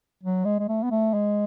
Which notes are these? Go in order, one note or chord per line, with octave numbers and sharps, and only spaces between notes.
F#3
G#3
G#3
A3
B3
A3
G#3